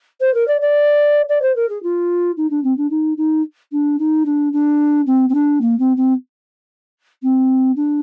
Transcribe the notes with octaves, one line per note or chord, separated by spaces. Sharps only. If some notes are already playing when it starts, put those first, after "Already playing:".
C5
A#4
D5
D5
D5
C5
A#4
G#4
F4
D#4
D4
C4
D4
D#4
D#4
D4
D#4
D4
D4
C4
C4
D4
A#3
C4
C4
C4
D4